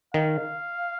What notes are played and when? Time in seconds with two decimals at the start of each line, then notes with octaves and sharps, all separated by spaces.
0.14 D#3 F5